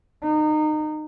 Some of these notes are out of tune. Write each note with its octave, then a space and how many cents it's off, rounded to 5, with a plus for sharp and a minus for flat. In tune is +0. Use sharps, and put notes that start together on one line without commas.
D#4 -25